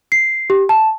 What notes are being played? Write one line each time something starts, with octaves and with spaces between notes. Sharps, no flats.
C7
G4
A5